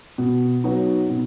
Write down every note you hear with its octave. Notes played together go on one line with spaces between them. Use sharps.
B2
F#3 B3 D#4 F#4
B2